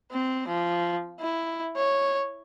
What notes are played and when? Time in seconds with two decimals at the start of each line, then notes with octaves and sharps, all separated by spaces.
0.12 C4
0.47 F3
1.20 E4
1.77 C#5